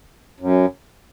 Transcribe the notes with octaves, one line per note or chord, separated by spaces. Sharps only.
F#2